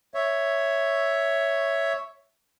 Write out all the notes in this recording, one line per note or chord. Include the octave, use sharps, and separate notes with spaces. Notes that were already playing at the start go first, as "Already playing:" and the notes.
C#5 E5